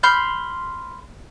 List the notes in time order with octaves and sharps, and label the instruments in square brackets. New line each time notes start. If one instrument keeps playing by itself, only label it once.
[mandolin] B5 C6 F6 G6